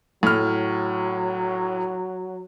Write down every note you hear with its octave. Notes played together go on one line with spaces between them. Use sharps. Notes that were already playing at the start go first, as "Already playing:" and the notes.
A2 F#3 F6